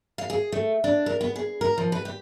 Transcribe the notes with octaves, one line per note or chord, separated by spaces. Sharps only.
F5
G#4
A3
D4
A#4
B3
G#4
A#4
F3
B4
G4